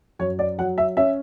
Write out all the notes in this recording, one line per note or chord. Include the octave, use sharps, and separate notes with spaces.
F#2 C#5
D5
F#3 F#5
E5
C#4 E5